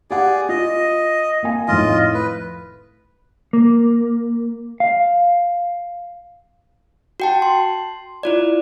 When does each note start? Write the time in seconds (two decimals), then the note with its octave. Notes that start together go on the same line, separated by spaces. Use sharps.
0.10 G4 G#4 D5 F#5
0.49 F4 D#5
1.43 A#3 G#5
1.68 F2 A2 D#3 F4 D#5
2.14 B4
3.53 A#3
4.80 F5
7.20 F#4 G5 A5
7.42 C6
8.23 E4 F4 D5